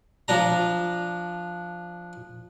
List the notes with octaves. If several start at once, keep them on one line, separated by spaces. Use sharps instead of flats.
F3 D4 A#5